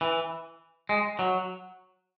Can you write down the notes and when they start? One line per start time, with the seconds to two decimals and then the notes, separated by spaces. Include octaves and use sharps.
0.01 E3
0.89 G#3
1.19 F#3